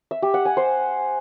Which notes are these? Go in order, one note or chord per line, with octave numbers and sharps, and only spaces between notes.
E5
G4
F#5
G#5
C5